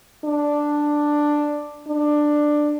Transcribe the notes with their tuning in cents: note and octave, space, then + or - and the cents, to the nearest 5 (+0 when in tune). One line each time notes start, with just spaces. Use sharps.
D4 +5
D4 +15